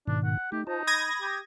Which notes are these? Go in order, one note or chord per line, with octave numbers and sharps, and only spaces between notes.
G#2 B2 D#3 D4
F#5
A3 D#4 G4
D#4 F4 C5 A5
B5 D#6 G#6 A#6
G4